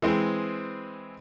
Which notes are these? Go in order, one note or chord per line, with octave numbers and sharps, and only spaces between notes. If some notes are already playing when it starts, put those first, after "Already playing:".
E3 G#3 C4 G#4